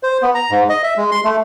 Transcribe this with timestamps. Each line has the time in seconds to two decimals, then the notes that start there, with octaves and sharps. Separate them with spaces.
0.03 C5
0.22 B3
0.35 A#5
0.51 G#2
0.69 D#5
0.83 E5
0.97 G#3
1.11 C6
1.24 A3